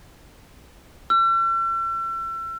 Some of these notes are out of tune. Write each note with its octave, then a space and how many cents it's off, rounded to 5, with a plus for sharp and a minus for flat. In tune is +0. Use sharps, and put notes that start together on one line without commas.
E6 +40